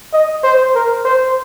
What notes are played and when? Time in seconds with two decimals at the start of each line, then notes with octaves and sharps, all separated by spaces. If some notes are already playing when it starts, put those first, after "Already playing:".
0.13 D#5
0.44 C5
0.75 A#4
1.05 C5